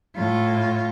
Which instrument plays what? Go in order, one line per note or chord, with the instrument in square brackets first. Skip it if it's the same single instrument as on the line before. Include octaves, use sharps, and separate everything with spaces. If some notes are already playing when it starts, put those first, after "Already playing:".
[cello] A2 F4